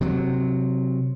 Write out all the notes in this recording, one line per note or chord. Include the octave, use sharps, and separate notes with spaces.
C3 F#3